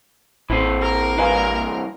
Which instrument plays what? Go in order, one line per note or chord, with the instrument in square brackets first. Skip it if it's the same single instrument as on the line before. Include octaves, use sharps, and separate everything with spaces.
[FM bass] A1 [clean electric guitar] E3 C4
[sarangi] A#4
[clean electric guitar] G2 C3 E3 [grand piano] B4 F5 G#5